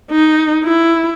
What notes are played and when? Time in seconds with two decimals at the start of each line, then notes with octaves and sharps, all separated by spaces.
0.11 D#4
0.64 E4